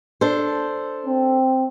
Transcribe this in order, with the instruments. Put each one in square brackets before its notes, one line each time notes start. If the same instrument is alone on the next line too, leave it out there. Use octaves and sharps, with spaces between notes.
[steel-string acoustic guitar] D4 A4 C5
[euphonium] C4